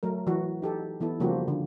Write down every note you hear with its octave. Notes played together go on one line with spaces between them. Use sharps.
F#3 A3 A#4
E3 F#3 F#4
D#4 G4 A4
E3 B3 E4 A4
C#3 F3 G3 A#3 F#4 G4
D3